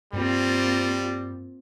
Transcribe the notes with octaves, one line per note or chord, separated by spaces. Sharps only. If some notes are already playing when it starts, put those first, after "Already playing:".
G2 G3 A#3 C4 F4